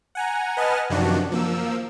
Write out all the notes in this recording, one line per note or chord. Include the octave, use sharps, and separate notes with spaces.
F#5 G#5 A#5
B4 D#5 F#5 G#5 A5 F6
F#2 C3 D#3 F3 D4 F#4
F3 A#3 E6